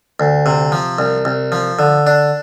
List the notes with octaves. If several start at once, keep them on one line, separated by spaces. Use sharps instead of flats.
D2
C3
F3
C2
C2
F3
D3
D4